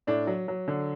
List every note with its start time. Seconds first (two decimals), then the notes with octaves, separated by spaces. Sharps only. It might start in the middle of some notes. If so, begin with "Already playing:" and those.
0.07 A2 D4
0.27 F#3
0.48 F#3
0.68 D3